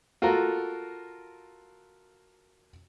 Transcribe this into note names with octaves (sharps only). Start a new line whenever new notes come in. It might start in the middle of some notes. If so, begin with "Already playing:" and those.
F4 F#4 A4 A#4